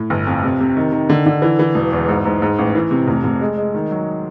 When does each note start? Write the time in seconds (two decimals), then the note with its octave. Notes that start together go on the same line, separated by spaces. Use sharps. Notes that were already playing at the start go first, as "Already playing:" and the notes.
Already playing: A2
0.10 G1
0.27 F2
0.43 C3
0.60 C3
0.77 D#3
0.92 D#3
1.09 D3
1.26 D3
1.42 E3
1.59 E3
1.75 E1
1.93 E2
2.08 G#2
2.25 G#2
2.42 G#2
2.58 A1
2.75 E3
2.91 C3
3.08 F1
3.24 F1
3.41 G#3
3.58 G#3
3.74 D#3
3.91 F#3